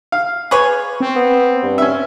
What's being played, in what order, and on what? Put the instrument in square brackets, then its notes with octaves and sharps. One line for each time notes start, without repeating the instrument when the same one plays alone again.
[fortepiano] F5
[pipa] G#4 B4 C#5
[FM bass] C4
[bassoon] B3
G2
[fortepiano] C#4 E5